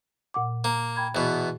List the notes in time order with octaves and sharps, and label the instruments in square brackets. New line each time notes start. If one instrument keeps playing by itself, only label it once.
[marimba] A#2 F#5 D6
[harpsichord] A#3
[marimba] G5 B5 G#6
[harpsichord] E2 B2